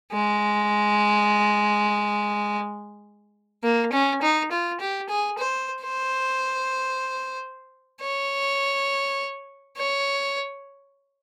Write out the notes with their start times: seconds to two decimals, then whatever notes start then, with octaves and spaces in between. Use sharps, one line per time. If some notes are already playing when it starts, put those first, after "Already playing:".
0.12 G#3
3.64 A#3
3.93 C#4
4.22 D#4
4.51 F4
4.80 G4
5.09 G#4
5.39 C5
5.83 C5
8.02 C#5
9.77 C#5